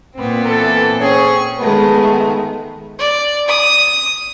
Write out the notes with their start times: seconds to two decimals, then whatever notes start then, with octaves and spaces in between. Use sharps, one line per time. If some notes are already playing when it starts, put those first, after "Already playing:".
0.14 A#2 B3 C4
0.46 E3 A4
1.00 C4 C#4 G#4 C#6
1.59 D#3 G#3 A3 B3
2.99 D5
3.48 D#6